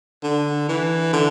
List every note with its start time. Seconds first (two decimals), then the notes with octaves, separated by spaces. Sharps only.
0.23 D3
0.69 E3
1.13 D3